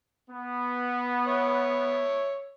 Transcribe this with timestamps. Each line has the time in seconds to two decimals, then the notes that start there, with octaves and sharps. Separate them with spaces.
0.30 B3
1.28 C#5 E5